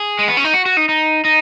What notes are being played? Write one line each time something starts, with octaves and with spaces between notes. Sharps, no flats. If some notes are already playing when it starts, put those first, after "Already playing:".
Already playing: G#4
G#3
B3
C#4
D#4
F#4
F#4
D#4
D#4
D#4